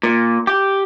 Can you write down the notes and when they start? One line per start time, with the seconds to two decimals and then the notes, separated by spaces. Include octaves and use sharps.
0.03 A#2
0.47 G4